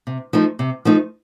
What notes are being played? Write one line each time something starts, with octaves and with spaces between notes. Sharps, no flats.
C3
F3 A3 D#4
C3
F3 A3 D#4